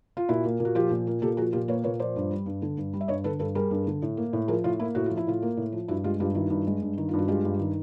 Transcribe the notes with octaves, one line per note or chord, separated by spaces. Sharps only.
F4
A#2 E4 F#4
A#3
A#2
F#4
F3 F4 G4
A#2
A#3
A#2 G4 A4
F3 F#4 G#4
A#2 F4 G4
A#3 B4 C#5
A#2 B4 C#5
F3 C5 D5
G2
G3
G2
D3
G2
G3
E5
G2 C#5 D#5
D3 A4 B4
G2 A4 B4
G3 G#4 A#4
G2
D3
A2
A#3
A2
F3 G#4 A#4
A2 F4
A#3 E4
A2 F#4
F3 F4
E4
A2 F4
A#3
A2
F3
G2 E4 F#4
G#3 F4 G4
G2 F4 G4
D#3 E4 F#4
G2
G#3
G2
D#3
G2 F4
F#4
G#3 F4 G4
G2
D#3